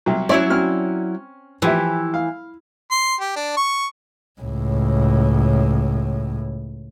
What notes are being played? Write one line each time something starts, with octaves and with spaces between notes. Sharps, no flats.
C2 F#3
F#3 C#4 E4 C#5 D5 E5
C4 C#4 F6
E3 F3 G4 E5
F5
C6
G4
D4
C#6
C#2 A2